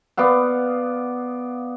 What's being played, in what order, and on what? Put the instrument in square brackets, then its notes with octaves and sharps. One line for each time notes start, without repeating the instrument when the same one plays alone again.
[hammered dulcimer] B3 D5 F5 F#5